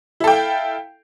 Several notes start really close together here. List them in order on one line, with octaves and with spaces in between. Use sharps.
E4 A4 G5 F5